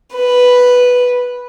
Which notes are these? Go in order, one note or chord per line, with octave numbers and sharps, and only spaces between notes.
B4